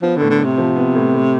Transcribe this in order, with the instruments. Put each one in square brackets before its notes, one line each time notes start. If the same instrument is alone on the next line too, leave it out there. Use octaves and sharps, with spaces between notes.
[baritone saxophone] F3 [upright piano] B3
[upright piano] A2 [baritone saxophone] D3
[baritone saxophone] D3
[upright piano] A2
[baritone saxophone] C3
[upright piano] F3
B3
A2
A2